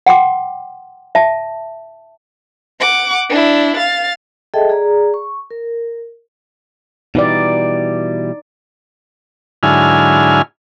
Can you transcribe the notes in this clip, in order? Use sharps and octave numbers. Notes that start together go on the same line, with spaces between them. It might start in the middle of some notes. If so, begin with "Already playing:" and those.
F#5 G5 C6 D6
E5 A5
F#5 D6
D4 E4
F5 A6
G#4 A4 D#5 E5 G5 A5
G#4 D5 A#5
C#6
A#4
B2 E3 G3 D#4 D5
G#2 D3 F#3 E4 G#5 F6